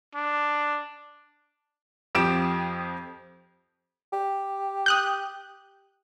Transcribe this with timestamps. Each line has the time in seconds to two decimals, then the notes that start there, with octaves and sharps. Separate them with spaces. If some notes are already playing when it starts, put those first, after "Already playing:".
0.15 D4
2.15 F2 F3 G4 D7 E7
4.13 G4
4.86 D#6 F#6 G6